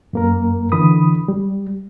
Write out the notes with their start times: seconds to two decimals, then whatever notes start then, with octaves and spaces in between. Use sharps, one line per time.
0.13 F#2 A#3 A#4
0.72 D3 E3 B5 D#6
1.28 G3